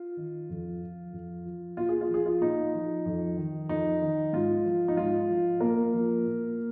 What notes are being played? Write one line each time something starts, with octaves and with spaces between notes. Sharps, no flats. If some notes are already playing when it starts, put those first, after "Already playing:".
Already playing: F4
D#3
F2
F3
F2
F3
A#2 F4
G#4
F4
F3 G#4
F4
A#2 D#4
F3
F2
D#3
F2 D#4
D#3
G#2 F4
F3
D#4
G#2 F4
F3
A#2 A#3 A#4
F3
A#2